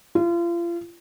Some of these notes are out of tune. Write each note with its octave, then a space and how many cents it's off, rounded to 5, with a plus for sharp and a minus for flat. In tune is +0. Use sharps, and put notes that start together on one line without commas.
F4 -35